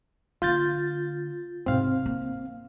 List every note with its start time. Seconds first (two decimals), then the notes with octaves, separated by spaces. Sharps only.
0.42 D3 A#3 F4 G6 A6
1.66 G#2 C3 C4 F5
2.06 A#3